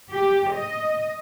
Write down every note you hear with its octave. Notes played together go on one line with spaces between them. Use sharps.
G4
D#5